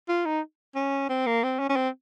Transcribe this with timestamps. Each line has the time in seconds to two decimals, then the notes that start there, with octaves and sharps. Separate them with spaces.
0.09 F4
0.26 D#4
0.75 C#4
1.09 C4
1.27 A#3
1.43 C4
1.59 C#4
1.69 C#4
1.76 C4